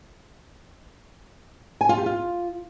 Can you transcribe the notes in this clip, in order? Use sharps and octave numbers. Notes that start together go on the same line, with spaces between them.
G#5
F4
G4
F4